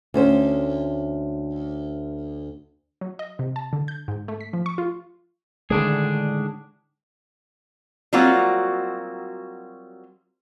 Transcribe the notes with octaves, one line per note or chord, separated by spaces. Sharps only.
D2 C#4 C5
F#3
D#5
C3
A5
D3
G6
G#2
A3
B6
F3
C#6
F4
A2 D3 D#3 G#3 D4 G#4
F#3 G3 A#3 C4 F4 F#4